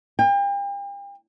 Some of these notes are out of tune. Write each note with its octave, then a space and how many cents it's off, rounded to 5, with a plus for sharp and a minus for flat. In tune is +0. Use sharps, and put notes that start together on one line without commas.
G5 +40